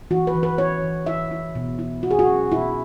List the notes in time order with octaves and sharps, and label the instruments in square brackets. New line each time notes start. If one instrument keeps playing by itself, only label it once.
[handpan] E3 F#4
B4
E3
B4
E4 C#5
E3
E4 E5
E4
B2
E4
B2 F#4
G#4
F#4
C#4
B2 E4